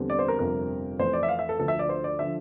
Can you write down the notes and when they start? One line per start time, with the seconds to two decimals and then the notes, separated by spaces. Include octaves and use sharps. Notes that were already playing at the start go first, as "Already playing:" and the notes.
Already playing: E2 D3 G3 C4
0.10 D5
0.19 C5
0.28 A#4
0.39 G1 F2 C3 A#4
0.99 F2 E3 A3 C5
1.13 D5
1.23 E5
1.29 F5
1.39 E5
1.49 A4
1.59 D2 D3 F3 A4
1.68 E5
1.79 D5
1.89 C5
2.04 D5
2.19 D3 F3 E5